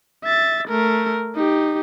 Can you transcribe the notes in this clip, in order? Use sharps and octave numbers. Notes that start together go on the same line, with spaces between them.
E5 A6
A3 A#4
D#4 G4